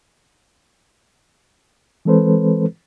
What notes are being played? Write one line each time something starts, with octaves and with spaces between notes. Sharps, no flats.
E3 G#3 C4 A4 B4 C5